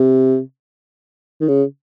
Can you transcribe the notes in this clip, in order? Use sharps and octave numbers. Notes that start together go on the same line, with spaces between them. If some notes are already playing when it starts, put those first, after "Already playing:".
Already playing: C3
D#3
C#3